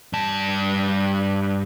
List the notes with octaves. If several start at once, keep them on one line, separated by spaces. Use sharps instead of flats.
G2 A5